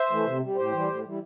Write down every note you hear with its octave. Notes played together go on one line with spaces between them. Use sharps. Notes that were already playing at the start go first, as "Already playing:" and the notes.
Already playing: C5 E5
E3 A3
C3
G3
A2 G4 C5
E3 G3
A2
E3 G3